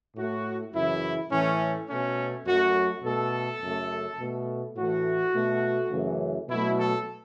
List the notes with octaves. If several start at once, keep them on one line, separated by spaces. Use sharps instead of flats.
A2 A3 F#4
F#2 C#3 E3 E4
A2 E3 A3 C#4
B2 A3 C#4
F#2 F#3 A3 F#4
B2 A3 A4
F#2 C#3 A3
B2 A3
A2 E3 A3 F#4
B2 A3
F#2 C#3 E3 A3
B2 F#3 A3 E4
A4